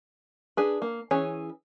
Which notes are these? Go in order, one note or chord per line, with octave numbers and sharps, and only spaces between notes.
D4 G#4 B4
A#3
E3 C#4 G#4 C#5